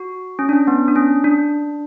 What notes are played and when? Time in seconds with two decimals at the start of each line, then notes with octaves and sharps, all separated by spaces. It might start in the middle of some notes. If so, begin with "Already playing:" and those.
Already playing: F#4
0.39 C#4
0.49 D4
0.53 C#4
0.68 B3
0.88 D4
0.96 C#4
1.24 D4